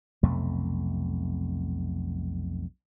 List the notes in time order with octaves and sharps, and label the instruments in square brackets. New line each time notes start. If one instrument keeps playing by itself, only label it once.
[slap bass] B1 F2 C3 A3